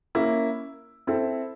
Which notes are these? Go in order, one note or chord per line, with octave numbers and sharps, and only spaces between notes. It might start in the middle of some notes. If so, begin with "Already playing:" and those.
A#3 C#4 E4
C4 E4 A4